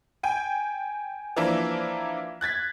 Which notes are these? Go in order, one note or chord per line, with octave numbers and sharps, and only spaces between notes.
G5 G#5
E3 F3 A#3 D4 E4
F#6 G#6 A6 B6